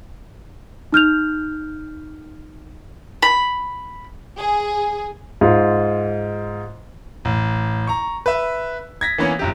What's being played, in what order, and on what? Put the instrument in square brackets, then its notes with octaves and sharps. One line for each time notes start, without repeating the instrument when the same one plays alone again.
[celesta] D#4 F6 G6 F7
[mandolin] B5
[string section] G#4
[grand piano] G#2 F4
A1
A#5 C#6
B4 E5
G#6 A#6 B6
E3 A#3 B3 C#4
G1 F#2 G4